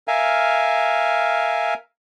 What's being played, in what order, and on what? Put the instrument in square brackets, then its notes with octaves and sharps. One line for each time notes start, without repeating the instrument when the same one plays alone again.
[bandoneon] A#4 E5 F5 G#5